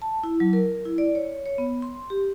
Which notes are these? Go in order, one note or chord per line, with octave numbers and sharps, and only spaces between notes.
A5
E4
F#3
A#4
E4
D5
C#5
C#5
B3
C6
G4